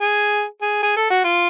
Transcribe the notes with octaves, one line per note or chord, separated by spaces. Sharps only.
G#4
G#4
G#4
A4
F#4
F4